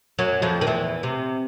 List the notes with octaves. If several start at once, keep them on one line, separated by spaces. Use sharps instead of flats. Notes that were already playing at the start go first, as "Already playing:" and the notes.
F#2 F#3
F2 F3
D#3
E2 E3
C3